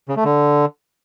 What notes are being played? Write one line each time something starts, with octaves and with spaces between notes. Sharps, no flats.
C#3
A3
D3